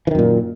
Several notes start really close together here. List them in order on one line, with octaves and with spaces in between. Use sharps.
E3 D#3 F#2 A#2